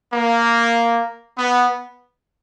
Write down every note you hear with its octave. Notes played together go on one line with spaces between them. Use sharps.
A#3
B3